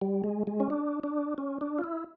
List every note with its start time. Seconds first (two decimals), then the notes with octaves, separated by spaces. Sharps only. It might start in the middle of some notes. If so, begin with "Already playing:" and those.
0.01 G3
0.24 G#3
0.47 G#3
0.60 C#4
0.70 D4
1.04 D4
1.38 C#4
1.61 D4
1.79 F4
1.84 E4